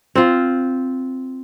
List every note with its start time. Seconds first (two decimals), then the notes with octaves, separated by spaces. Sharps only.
0.15 C4 F4